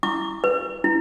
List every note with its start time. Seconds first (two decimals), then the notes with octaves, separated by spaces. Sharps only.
0.03 E4 D6
0.44 B4
0.84 E4